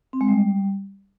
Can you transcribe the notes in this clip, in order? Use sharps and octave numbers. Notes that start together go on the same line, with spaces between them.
C4
G#3
G3